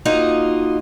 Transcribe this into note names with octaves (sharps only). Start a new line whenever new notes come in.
A#3 D#4 F4 F#4 D#5